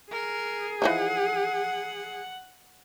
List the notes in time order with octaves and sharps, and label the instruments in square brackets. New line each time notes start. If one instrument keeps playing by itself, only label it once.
[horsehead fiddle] G#4 [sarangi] A#4
[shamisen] E3 F3 D#4 [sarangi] F#5